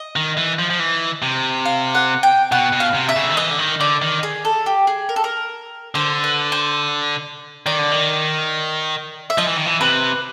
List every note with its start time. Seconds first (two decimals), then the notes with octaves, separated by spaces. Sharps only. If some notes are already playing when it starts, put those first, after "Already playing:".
Already playing: D#5
0.16 D#3
0.37 E3
0.59 F3
0.70 F3
0.80 E3
1.22 C3
1.65 F5
1.95 F#5
2.23 G5
2.52 B2 F#5
2.73 B2
2.80 F5
2.94 C3
3.09 E5
3.16 C#3
3.23 D3
3.30 D#3
3.37 E3 D#5
3.51 D3
3.59 D#3
3.80 D3 D5
4.02 D#3
4.23 G#4
4.45 A4
4.66 G4
4.87 G#4
5.09 A#4
5.16 A4
5.24 A#4
5.95 D3 C5
6.24 B4
6.52 C5
7.66 D#3 D5
7.79 D3
7.92 D#3
9.30 E5
9.38 F3 D#5
9.47 E3
9.56 D#3
9.66 E3
9.80 C3 B4